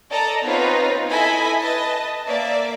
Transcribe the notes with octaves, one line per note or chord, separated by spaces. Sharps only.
A4 D5 D#5 A5 A#5
B3 C4 D#4 F4 B4 C#5
E4 A4 D#5 G#5 B5
B4 D#5 A5
A#3 D5 E5